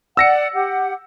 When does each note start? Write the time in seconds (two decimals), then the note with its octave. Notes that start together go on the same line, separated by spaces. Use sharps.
0.17 D5 F#5 E6 A#6 C#7
0.54 G4 F#5